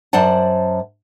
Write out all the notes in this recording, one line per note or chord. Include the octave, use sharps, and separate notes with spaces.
F#2 C5 D5 F#5 A5